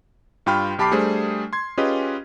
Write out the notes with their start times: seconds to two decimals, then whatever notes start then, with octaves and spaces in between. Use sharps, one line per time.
0.46 G2 F4 G5 B5 F6
0.79 B1 G4 A5 B5 D6 C7
0.92 G3 A3 D4 G#4 C5
1.53 C6 G#6
1.78 C#4 F4 G4 G#4 B4 D#5